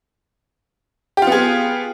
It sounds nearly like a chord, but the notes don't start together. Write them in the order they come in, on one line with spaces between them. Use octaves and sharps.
G4 F4 B3 G#4